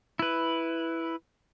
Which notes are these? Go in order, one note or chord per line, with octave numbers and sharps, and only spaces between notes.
E4 B4